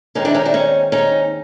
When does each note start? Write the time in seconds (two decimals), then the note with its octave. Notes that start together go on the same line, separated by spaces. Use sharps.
0.15 D#2 D#3 G#3 C4 C#4 D#4
0.25 D4 E4
0.35 C#4 D#4
0.45 D4 E4
0.54 C#4 D#4
0.92 C#4 D#4